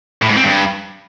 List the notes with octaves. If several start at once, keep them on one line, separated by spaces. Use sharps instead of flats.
A2
G#2
C4
G2